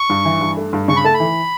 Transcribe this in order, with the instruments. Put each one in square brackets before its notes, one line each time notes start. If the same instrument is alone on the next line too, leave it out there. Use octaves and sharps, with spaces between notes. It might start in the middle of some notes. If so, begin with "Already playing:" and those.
Already playing: [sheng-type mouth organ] C#6
[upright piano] G2
E3
G2
A3
G2
[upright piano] C#3 [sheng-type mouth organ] C#6
[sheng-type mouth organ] B5
[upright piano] A3 [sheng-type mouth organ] A5
[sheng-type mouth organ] B5
[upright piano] E3